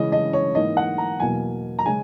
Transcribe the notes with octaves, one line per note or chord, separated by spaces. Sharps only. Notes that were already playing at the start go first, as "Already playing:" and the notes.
Already playing: C#3 E3 G#3 C#4 D#5
D#5
C#5
G#2 E3 A#3 D#5
F#5
A#5
E2 B2 F#3 A#3 G#5
A#5
C#3 G#3 C#4 G#5